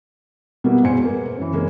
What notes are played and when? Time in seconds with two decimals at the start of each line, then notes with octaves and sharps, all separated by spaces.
0.64 B2 G3 A#3 B3 E4 F#4
0.83 E1 E2 G#3 C5 G#5 C#7
1.04 A#3 B4
1.37 F#2 E3
1.53 C#3 E3 G#3 A#3 C#4